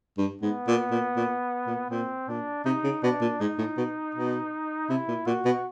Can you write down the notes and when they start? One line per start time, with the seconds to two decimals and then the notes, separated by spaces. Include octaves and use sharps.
0.18 G2
0.42 G#2 B3
0.67 A#2
0.91 A#2
1.16 A#2
1.67 A#2
1.91 A#2 C4
2.28 A#2 D4
2.65 C3 D#4
2.84 C#3
3.03 B2 D4
3.21 A#2
3.40 G#2 D#4
3.58 A2
3.77 B2
4.15 B2
4.89 C3 E4
5.08 A#2
5.27 A#2 F#4
5.45 B2